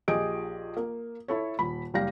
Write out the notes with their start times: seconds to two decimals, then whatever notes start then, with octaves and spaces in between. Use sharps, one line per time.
0.08 A#1 F3 G4 G#4 D#5 D7
0.77 A#3
1.28 E4 A4 C#5
1.59 D#1 B5
1.94 F#1 G3 G4 F5 A#6